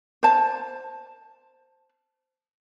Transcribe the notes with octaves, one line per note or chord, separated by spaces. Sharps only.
C5 A5